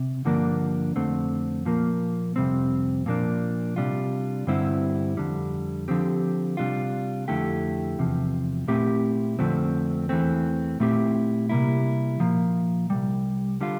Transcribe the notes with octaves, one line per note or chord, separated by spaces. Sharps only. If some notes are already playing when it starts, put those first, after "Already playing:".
Already playing: C3
G2 D3 F3 A#3 D4
F2 D3 A3 C4
A#2 F3 A#3
F2 C3 G3 C4
A#2 F3 A#3 D4
C3 G3 D4 F4
G2 D3 G3 C4 E4
F2 D3 G3
D3 F3 C4 G4
C3 G3 D4 F4
F2 D3 A3 E4 G4
E2 C3 F3
A#2 A3 C4 E4 G4
F2 D3 F3 A3 C4
E2 E3 A3 C4
A#2 A3 C4 E4 G4
C3 G3 A#3 E4
A#2 F3 A#3
C2 A#2 G3
D3 G3 D4 F4